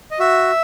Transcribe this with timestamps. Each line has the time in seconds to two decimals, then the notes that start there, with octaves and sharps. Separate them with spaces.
0.11 D#5
0.19 F#4 E5